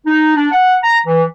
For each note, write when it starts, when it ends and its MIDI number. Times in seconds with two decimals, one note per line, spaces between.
0.06 0.34 63
0.36 0.47 62
0.52 0.76 78
0.83 0.97 82
1.07 1.23 52